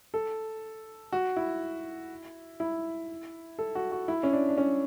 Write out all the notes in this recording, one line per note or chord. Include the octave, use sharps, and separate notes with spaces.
A4
F#4
E4
E4
A4
F#4
F#4
E4
C#4
D4
D4
C#4